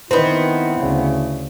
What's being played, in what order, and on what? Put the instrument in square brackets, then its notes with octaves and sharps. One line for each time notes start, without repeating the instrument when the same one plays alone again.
[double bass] D#3 [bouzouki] B3 C4 [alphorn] E4
[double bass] D2 C#3